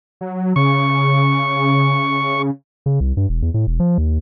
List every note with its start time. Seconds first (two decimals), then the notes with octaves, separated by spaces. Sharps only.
0.21 F#3
0.56 C#3 C#6
2.86 C#3
3.00 C2
3.17 G2
3.29 E1
3.42 E2
3.54 A2
3.67 E1
3.80 F3
3.98 D#2